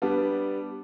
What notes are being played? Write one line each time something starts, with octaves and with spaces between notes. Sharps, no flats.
G3 B3 D4